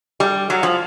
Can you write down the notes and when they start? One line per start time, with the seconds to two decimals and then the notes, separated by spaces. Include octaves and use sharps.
0.20 G3
0.50 F#3
0.63 F3